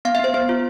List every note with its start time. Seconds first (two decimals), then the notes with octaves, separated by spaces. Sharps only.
0.05 B3 F5
0.15 E5
0.20 B3 C5
0.34 B3 C5
0.49 F4